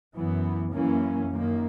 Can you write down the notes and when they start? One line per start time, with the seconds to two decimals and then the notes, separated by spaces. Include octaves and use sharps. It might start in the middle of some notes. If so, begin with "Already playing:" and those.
0.17 F#2 E3 B3
0.74 F#2 E3 A#3 C#4
1.31 F#2 D#3 A#3